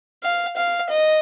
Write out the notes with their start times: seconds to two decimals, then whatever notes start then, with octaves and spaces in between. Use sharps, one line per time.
0.23 F5
0.57 F5
0.90 D#5